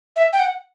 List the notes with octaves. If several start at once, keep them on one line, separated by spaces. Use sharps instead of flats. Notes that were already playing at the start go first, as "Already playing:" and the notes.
E5
G5
F#5